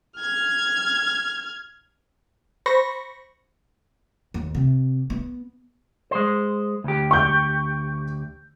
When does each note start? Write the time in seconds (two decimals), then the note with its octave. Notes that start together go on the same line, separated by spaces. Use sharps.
0.19 F6 G#6
2.66 C5 B5 C#6 A#6
4.34 D#2
4.55 C3
5.10 B3
6.11 G#3 C5
6.84 D2 G4
7.11 C#6 G6